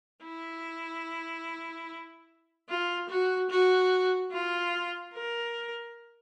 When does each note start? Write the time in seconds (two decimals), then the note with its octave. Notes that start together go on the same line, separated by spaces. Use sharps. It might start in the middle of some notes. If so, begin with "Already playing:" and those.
0.24 E4
2.69 F4
3.09 F#4
3.50 F#4
4.32 F4
5.14 A#4